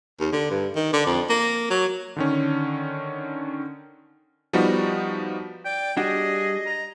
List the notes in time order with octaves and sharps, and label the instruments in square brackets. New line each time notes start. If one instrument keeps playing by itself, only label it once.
[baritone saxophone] D#2
D3
G2
D#3
D3
F2
A#3
F#3
[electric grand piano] D3 D#3 C#4
F3 G3 B3 D#4 F#4
[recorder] D5 [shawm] G5
[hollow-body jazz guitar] G3 D4 F#4 [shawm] G#4 [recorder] D#5
[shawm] A#5